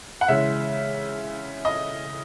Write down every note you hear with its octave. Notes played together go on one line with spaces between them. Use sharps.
F#5
C#3 E3 G#3 E5
D#5